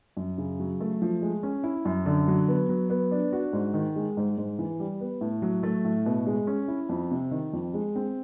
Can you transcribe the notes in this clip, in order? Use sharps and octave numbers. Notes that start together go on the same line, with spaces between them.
F#2
C#3
F#3
A3
F3
G#3
C#4
E4
F#2
D3
F#3
B3
F#3
B3
D4
F#4
G#2
D#3
G#3
G#2
G#2
E3
G3
B3
A2
F#3
A3
A2
B2
G#3
C#4
E4
F2
C3
D#3
F2
G#3
C4